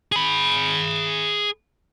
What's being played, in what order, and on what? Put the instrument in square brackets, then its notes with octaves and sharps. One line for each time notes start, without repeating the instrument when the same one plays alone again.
[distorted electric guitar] G#4 B5